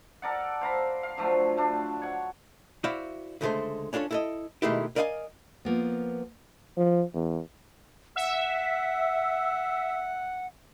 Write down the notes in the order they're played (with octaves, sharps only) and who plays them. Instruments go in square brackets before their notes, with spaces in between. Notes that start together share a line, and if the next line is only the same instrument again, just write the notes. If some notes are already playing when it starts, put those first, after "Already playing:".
[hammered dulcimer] A4 A#4 D5 F#5
C5 F5 A#5 B5
F5
D3 F3 F#3 A3
A3 D4
C#5 F#5
[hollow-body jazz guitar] E4 F#4 C5 D5 E5 F5
C#2 D3 G#3 A3 A4 C5
C#4 D4 F4 A4 C#5
E4 A4 D#5
B2 D#3 G#3 A3 E4 G4
A#4 D5 D#5 F5 F#5 G#5
[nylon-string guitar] F3 A#3 B3
[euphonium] F3
E2
[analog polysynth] E5 [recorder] F#5